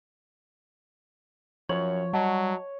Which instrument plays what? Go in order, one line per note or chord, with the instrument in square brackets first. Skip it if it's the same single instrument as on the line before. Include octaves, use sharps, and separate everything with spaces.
[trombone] F#2 [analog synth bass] F3 [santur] C#5 [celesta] F#7
[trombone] F#3 [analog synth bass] G3 [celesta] D#5 F#5 A5